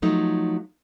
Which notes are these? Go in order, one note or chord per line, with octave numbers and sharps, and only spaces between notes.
F3 F#3 A3 D#4